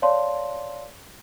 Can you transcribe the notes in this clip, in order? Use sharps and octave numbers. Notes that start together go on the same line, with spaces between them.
C#5 D5 F5 A5 C6